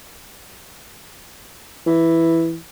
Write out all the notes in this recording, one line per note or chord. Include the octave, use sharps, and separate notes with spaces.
E3